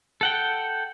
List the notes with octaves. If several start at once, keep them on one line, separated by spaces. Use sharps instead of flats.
A4 F#5 G5